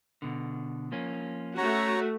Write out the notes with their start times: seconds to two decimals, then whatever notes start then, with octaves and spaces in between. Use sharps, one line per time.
0.22 B2 D3
0.92 F3 A#3 C#4
1.57 A3 C#4 F#4 C#5 A#5